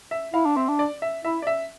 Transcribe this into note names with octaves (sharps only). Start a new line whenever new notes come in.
E5
E4 F5
D4
C4 E5
D4
D5
E5
E4 E5
D5
E5